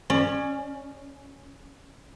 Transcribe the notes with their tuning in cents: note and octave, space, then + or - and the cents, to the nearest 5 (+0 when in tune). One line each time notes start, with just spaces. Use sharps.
C#4 +0 D5 +30